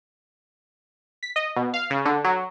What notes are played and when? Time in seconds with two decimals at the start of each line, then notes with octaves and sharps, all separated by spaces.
1.23 B6
1.36 D#5
1.56 B2
1.74 F5
1.90 C#3
2.05 D3
2.24 F#3